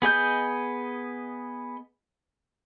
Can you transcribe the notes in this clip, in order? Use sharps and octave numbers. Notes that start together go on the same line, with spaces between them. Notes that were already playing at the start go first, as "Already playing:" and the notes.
B3 G#4 D#5 G6